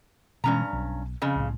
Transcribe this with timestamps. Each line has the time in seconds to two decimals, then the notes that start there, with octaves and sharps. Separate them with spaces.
0.44 G2 B2 E3 G#3 C#4 A#5
0.73 B1
1.22 F2 C#3
1.35 C2 A2